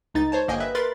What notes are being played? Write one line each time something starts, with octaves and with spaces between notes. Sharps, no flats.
C#2 D#4 A6
C5 C#5 A5
G1 A#3 D#5 G5 G#5
B4 E5
A#4 B4 B5 C6 A6